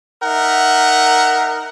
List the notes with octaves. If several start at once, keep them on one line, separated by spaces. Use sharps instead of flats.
D#4 A#4 E5 F#5